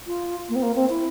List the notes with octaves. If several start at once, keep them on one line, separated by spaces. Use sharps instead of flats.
F4
A#3
C4
A#3
C4
E4